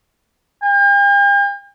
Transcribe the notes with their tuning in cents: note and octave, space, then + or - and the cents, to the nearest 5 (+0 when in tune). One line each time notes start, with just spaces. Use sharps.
G5 +45